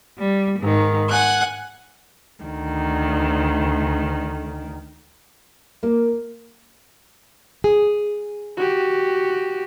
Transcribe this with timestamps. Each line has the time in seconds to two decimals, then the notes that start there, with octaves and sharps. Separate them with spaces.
0.18 G3
0.58 G#2 D#3
1.08 F#5 G#5 F#6
2.44 D2 D#3
5.83 A#3
7.64 G#4
8.57 F#4 G4